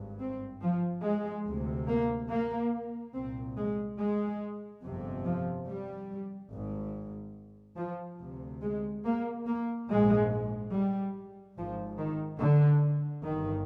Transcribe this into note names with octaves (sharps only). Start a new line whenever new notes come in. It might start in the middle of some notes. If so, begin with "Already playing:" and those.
Already playing: G#1 G2
C4
F3
G#3
D2 C3
A#3
A#3
C2 A#2 C4
G#3
G#3
G1 F2 C3
F3
G3
G#1 G#2
F3
D2 C3
G#3
A#3
A#3
A#1 G#2 G#3
G3
G#1 G#2 F3
D#3
D3
G1 G2 D#3